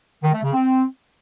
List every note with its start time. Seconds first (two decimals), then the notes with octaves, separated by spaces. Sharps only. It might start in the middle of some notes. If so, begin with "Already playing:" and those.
0.23 D#3
0.33 A3
0.44 C#3
0.54 C4